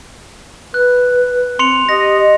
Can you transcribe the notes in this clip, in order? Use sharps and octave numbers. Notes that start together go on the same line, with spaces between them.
B4 F#6
C4 C6 C#7 F7
G4 D#5 A#6